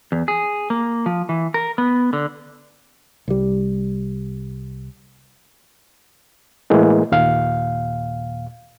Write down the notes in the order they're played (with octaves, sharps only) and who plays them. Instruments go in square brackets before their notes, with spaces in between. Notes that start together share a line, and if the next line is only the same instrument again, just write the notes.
[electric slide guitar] E2
G#4
A#3
F3
E3
A#4
B3
D3
[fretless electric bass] C2 G3
[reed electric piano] A2 E3 G#3 A#3
D#2 A#2 F5